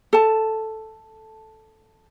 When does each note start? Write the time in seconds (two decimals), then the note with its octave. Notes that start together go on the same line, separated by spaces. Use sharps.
0.13 A4 A5